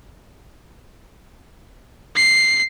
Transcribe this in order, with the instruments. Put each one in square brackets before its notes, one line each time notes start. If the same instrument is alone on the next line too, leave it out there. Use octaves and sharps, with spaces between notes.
[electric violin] C7